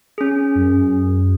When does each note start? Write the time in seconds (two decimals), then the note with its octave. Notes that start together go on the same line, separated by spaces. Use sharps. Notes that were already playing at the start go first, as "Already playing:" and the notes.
0.18 C#4 G#4
0.55 F#2